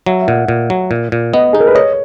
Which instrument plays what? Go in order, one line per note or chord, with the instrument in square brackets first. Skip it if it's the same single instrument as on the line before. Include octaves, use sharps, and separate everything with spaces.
[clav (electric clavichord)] F#3 [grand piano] E5
[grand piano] E5
[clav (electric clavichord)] A#2 [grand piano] F#5
[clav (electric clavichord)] A#2
F#3
A#2
A#2
[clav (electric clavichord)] B3 [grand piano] D#5
[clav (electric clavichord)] D#4 [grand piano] G#4
[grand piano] A#4
B4
[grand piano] C#5 [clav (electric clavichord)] D#5